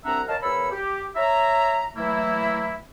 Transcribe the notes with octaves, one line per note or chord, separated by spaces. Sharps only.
C2 C4 D4 E5 F#5 A#5
A#4 C#5 D#5 F5 A5
E2 A#4 C#5 B5 E6
G4
C#5 E5 A#5
E3 F#3 A3 A#3 E4